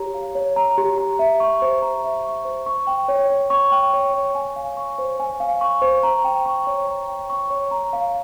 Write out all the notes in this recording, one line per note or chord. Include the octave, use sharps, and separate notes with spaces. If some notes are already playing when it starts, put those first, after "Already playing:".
Already playing: G4 C#5 A#5
F5
C#5
A#5
G4
A#5
E5
C#6
C5
A#5
E5
C#6
C5
C#6
G5
C#5
C#5
C#6
G5
C#5
C#5
G#5
F5
C#6
C5
G#5
F5
C#6
C5
A#5
G5
C#6
C#5
A#5
G5
C#6
C#5
A#5
F5